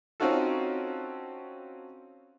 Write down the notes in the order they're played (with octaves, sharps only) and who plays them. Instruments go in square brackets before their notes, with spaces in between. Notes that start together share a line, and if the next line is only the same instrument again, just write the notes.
[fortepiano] C4 C#4 D#4 F4 F#4 A4